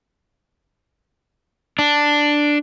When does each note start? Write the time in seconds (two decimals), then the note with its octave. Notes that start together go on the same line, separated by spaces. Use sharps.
1.79 D4